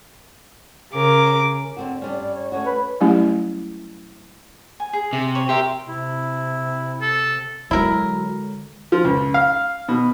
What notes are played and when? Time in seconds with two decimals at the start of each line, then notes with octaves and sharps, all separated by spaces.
0.93 C#3 A#4 D6
1.77 D3 C4 F#4
2.02 G2 G3 C#4 D5
2.35 C#5
2.52 A3 C#4 F#4 C#5
2.66 B4
3.01 F#3 G3 A3 C#4 E4 G4
4.80 G#5
4.93 G#4
5.13 C3
5.35 C#5
5.49 G4 A#4 E5 C6
5.88 C3 E4
7.02 A4
7.71 D3 F#3 G#3 E4 A#4
8.92 F3
9.04 C#2
9.34 F5
9.88 B2